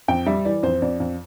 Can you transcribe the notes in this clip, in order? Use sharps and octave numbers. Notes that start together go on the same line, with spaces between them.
F2 G5
G3 E5
E3 D5
F2 C5
F2 D5
F2